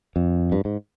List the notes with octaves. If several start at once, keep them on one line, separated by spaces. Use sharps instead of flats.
F2
G2
G#2